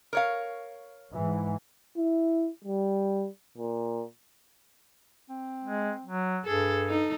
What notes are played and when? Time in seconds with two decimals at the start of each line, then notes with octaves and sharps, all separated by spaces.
0.13 A#4 C#5 F5
1.13 G#2 E3
1.97 E4
2.64 G3
3.58 A#2
5.29 C4
5.64 G#3
6.06 F#3
6.46 G2 G#4 A4
6.86 D#4 A4